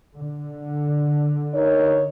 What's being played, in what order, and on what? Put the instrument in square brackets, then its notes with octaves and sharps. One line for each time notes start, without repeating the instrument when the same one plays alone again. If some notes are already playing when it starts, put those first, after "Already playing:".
[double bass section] D3
[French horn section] D#4 A#4 C#5